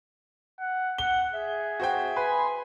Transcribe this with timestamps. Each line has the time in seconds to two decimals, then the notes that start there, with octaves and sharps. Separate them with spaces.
0.59 F#5
0.98 F#5 G7
1.33 G#4 E5
1.80 F#4 C5 G5
2.17 B4 G#5 B5 C6